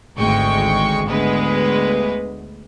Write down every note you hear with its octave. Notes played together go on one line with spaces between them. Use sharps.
G#1 D2 G#3 G5 C#6
D2 G#3 B3 B4